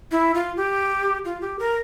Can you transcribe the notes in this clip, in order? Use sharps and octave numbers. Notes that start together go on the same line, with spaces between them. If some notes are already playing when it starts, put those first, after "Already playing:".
E4
F4
G4
F4
G4
A#4